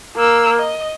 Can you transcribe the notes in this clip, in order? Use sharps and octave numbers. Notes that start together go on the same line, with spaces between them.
A#3 E6
D#5